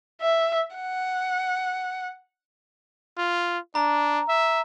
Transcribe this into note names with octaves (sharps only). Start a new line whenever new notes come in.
E5
F#5
F4
D4 A#5
E5